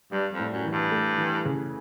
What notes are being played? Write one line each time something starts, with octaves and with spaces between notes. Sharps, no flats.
G2 G3
F2
A2
F#2
E3
G2
A3
E3
C#3